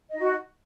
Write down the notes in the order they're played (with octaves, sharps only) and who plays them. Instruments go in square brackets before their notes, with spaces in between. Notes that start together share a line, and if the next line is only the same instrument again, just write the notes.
[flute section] D#5
D#4
F#4